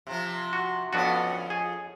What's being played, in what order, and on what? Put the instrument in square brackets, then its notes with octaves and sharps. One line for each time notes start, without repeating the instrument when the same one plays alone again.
[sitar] C3 F3
[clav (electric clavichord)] F#4
[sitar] F2 C#4 [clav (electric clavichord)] B3 D4 F#4
[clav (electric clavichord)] G#4